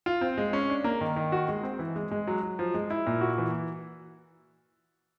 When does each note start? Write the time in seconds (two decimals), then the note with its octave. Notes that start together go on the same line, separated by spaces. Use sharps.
0.06 F4
0.21 C4
0.38 G#3
0.53 C#4
0.70 D4
0.84 A#3
1.01 D#3
1.16 D#3
1.32 F#4
1.48 G#3
1.63 C4
1.79 E3
1.96 G#3
2.11 G#3
2.27 F#3
2.43 F#3
2.59 F3
2.74 G#3
2.90 E4
3.06 A#2
3.21 F#4
3.38 E3